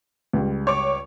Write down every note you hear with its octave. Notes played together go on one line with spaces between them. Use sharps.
C#2 G3
C#5 D6